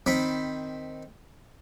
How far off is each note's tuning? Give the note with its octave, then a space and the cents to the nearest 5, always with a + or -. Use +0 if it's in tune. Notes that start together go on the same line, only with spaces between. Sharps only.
D#3 +0 C4 +0 B5 +0